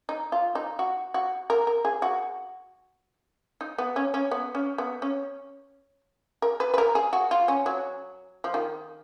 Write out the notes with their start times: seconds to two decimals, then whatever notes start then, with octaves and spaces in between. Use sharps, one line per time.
0.09 D#4
0.32 F4
0.55 D#4
0.79 F#4
1.14 F#4
1.50 A#4
1.67 A#4
1.85 G#4
2.02 F#4
3.61 D#4
3.78 B3
3.96 C#4
4.14 C#4
4.31 B3
4.55 C#4
4.78 B3
5.02 C#4
6.42 A#4
6.60 B4
6.74 B4
6.78 A#4
6.95 G#4
7.13 F#4
7.31 F4
7.48 C#4
7.66 F#3
8.44 F3
8.54 D#3